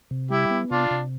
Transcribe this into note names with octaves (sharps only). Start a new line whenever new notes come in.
C3
G3 E4 G4
B3
C3 D4 F4
C3